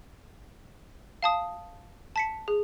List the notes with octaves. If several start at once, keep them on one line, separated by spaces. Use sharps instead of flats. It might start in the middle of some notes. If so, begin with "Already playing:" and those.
F5 A5 D#6
A5 B6 C#7
G#4